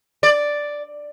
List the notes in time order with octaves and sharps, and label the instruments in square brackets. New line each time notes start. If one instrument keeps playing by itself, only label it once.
[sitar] D5